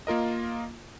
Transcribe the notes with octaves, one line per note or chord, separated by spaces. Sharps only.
A#3 F4 A#4 D#5